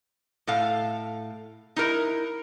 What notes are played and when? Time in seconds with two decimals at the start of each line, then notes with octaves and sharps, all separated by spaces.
0.47 A2 A4 F5
1.76 D#4 E4 A#4